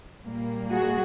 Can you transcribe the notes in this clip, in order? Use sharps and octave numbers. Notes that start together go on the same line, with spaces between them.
A#2 G3 A#3
F#4 G#4